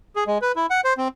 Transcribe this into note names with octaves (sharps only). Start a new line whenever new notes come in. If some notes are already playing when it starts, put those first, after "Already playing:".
G#4
G#3
B4
E4
F#5
C5
C4